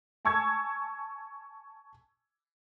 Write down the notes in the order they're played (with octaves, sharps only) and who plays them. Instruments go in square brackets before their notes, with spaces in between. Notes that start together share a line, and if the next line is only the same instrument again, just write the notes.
[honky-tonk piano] G#5 A5 C#6 E6 G#6